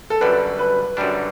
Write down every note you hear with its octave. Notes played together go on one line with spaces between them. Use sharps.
A4
F#2 D3 G3 D4 B4
B4
F#2 D3 G3 D4